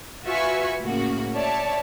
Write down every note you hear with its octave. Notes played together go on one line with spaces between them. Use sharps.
F4 F#4 B4 E5 G#5 C#6
A2 C#3 A#3 F#4
C#5 D5 E5 A5